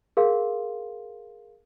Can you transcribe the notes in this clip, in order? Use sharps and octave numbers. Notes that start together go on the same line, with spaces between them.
G#4 A#4 F5 C6